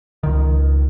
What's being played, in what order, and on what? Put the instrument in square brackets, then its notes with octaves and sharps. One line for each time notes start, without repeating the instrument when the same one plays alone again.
[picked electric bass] C#2 D#3